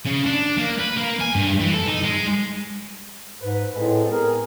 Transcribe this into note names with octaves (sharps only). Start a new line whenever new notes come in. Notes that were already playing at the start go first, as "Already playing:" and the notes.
C#3
D4
A#3
B4
A#3
G#5
G2
E3
A4
D#4
G#3
G#2 B4
A2 G#3 C4 A4
B3 G#4 A#4